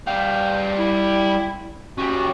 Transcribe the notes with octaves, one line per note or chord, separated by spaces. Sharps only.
G3 F5 G5
E4
C#4 F#4 G4